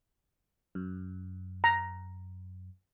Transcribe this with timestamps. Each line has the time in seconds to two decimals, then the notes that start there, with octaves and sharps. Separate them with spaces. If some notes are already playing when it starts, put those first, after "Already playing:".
0.75 F#2
1.64 A#5